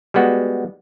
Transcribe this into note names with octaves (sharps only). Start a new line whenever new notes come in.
G3 G#3 B3 F#4